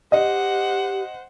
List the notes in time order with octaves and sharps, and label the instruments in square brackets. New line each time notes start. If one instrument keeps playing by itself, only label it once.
[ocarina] G4 [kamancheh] C5 F#5 [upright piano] D#5